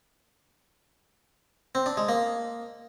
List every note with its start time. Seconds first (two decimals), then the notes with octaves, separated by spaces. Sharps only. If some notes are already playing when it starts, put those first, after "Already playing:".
1.75 C4
1.86 D4
1.97 G#3
2.09 A#3